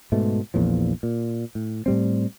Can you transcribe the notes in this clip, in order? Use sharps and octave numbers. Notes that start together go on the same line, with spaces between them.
G#2 B2 A3
A#1 E2 A#2 F3
A#2
A2
A2 G3 C4